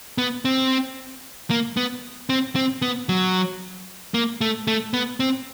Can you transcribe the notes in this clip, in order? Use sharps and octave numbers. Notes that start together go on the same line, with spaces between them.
B3
C4
A#3
B3
C4
C4
B3
F#3
A#3
A3
A3
B3
C4